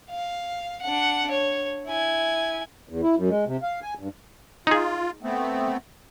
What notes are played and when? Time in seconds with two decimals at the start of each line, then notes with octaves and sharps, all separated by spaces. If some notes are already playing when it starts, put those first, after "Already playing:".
0.10 F5
0.82 D4 F#5
1.31 C#5
1.87 E4 G#5
2.89 E2
3.03 E4
3.17 F#2
3.29 G#3
3.47 C3
3.62 F5
3.82 G#5
3.99 G2
4.67 D#4 F4 G#4
5.23 A3 B3 C4